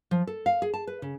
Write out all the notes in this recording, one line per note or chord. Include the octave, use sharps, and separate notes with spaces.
F3
A4
F5
G#4
A5
B4
C#3